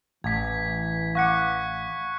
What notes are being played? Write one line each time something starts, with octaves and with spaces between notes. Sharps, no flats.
A1 E3 G#6 B6
F5 F#5 C#6 D6 F#6 C#7